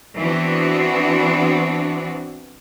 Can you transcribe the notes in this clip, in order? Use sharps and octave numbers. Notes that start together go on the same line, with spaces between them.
E3 B3 C4 D4 F#4